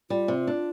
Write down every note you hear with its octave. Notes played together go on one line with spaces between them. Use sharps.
G3 F4
C3
D4